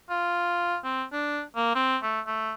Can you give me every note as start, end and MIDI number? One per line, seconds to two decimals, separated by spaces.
0.10 0.77 65
0.84 1.04 60
1.12 1.41 62
1.56 1.74 58
1.75 1.97 60
2.03 2.20 57
2.26 2.54 57